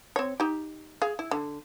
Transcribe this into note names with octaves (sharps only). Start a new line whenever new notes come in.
C4 C#5
D#4 G4
G#4 F5
E4
D3